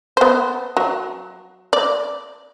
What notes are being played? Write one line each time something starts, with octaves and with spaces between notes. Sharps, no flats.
B3 C5
F#3
D5